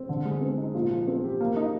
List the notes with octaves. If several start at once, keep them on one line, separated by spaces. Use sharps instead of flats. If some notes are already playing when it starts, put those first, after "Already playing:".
Already playing: C4
D3
G#3
C4
D#4
A#2
F3
C4
G4
A#3
D#4